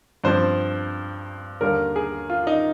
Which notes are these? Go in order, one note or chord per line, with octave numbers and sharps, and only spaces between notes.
G2 F3 C4 C5
D#2 D3 G3 A#3 A#4
G#4
F4
D#4